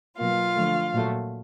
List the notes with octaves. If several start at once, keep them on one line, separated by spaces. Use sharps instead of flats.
B2 F#3 A#3 F4 F5
D3 F3 A3
A#2 F#3 A3